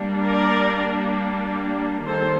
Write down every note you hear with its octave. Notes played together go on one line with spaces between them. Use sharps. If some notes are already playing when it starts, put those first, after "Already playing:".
Already playing: G3 A#3 D4
A#4 D5
D#3 G3 A#3 A4 C5